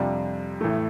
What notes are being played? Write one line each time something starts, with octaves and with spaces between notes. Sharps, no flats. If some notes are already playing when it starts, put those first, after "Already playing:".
Already playing: F2 C3 G3 D4 F4
A1 A2 A3